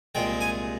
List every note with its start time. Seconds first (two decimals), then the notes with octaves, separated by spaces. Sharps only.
0.15 C2 A#2 G#3 G5
0.41 G#5